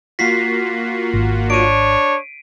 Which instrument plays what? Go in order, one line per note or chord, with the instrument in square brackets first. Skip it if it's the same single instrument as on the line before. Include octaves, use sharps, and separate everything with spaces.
[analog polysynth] A#3 F4 F#4 [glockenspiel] B6 C7
[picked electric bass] G#1
[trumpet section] D4 C#5 [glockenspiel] D7 D#7